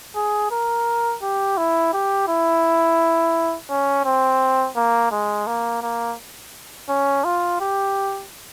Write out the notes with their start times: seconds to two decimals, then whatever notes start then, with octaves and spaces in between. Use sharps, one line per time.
0.15 G#4
0.51 A#4
1.22 G4
1.58 E4
1.93 G4
2.28 E4
3.69 C#4
4.05 C4
4.76 A#3
5.12 G#3
5.47 A#3
5.82 A#3
6.89 C#4
7.24 F4
7.60 G4